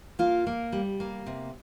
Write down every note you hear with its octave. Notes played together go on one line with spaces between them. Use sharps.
A#3 F4
A#3
G3
A#3
C3